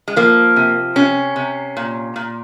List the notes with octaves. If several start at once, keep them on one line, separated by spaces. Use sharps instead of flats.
G#3
F3 A#3
C3
C3 C#4
C3
A#2
A#2